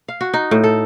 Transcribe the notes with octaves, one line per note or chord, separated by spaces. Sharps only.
F5
F#4
D#4
A2
A4